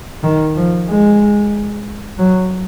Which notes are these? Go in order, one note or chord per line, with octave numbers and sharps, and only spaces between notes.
D#3
F3
G#3
F#3